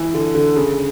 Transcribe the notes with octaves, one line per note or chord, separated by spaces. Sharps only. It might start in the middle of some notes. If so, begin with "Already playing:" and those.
Already playing: E3
D3
D3
C#3